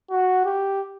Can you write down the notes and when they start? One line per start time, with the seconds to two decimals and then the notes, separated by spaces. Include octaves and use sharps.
0.11 F#4
0.45 G4